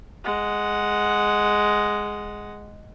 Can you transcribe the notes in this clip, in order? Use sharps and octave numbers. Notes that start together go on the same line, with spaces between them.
G#3 F#5